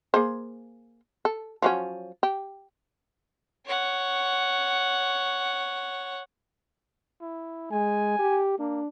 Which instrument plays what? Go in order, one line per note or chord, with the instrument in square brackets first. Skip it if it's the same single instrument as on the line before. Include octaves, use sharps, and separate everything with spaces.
[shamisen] A#3 G#4 C5
A4
F3 F#3 C#4
G4
[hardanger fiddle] C#5 F#5
[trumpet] E4
[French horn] G#3 [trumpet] G#5
[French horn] G4
[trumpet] A#3 [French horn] D4